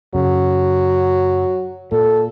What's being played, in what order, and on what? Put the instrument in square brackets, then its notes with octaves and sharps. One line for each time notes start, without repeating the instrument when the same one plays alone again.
[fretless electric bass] F#2 C#3 [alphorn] F#3
[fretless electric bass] A#2 [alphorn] A4